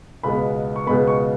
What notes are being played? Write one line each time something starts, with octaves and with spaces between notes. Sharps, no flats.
C#2 B2 G#3 B3 B5
C#6
C#2 B2 G#3 B3 B5
C#6